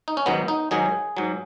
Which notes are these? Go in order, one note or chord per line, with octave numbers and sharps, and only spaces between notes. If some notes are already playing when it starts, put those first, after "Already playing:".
D#4
C#4
G#2 D#3 F#3 B3
D#4
G#2 D#3 F#3 G#4
G#2 F#3